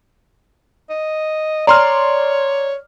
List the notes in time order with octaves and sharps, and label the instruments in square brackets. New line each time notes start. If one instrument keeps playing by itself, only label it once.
[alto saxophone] D#5
[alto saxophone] C#5 [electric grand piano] D5 C6 F6 [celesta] A#5